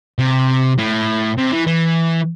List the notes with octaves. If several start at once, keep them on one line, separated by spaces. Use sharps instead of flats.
C3
A2
C3
E3
E3